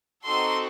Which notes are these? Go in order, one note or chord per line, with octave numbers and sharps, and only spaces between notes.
C4 D#4 F#4 A4 C6